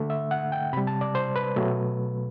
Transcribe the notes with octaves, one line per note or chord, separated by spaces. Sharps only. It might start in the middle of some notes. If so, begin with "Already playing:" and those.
Already playing: D3 A3
E5
F#5
G5
C3 G3 B5
A5
D5
C5
B4
B2 F#3 A3